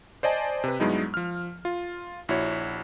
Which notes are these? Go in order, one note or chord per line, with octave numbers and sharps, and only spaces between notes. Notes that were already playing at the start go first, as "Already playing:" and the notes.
C5 D5 D#5 G#5 A5
C3 B4
G2 F#3 G#3 B3 D#4 E4
F3 F6
F4
A#1 E4 F#4 C#5